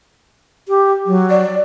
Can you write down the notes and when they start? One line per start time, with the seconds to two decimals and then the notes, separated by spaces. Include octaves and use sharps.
0.68 G4
1.06 F#3
1.30 D5